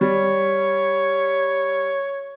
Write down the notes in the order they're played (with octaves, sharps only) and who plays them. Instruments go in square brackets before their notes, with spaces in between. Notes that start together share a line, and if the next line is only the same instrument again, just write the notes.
[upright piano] G3 [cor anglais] C#5